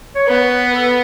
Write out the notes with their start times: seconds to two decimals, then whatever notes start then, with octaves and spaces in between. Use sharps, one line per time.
0.15 C#5
0.27 B3 B4
0.75 A4